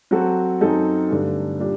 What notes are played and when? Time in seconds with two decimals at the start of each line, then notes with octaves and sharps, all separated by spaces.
0.11 F#3 C4 F#4 A4
0.61 F#2 F#3 C4 D#4 A4
1.10 G2 D3 A3 D4
1.59 A#2 G3 D4